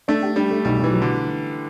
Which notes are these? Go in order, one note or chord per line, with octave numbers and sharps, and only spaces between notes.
A3 D4
G4
G3 D4
A3
B1 G3
B1
E3
F#3
D3